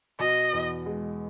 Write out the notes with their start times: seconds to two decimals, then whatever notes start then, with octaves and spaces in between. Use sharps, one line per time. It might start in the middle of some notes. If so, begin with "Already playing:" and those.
0.20 B2 D#5
0.53 E2
0.86 G#3